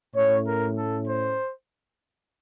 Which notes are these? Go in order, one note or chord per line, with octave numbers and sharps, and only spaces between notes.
A2 A3 C#4 C#5
A#4
A4
C5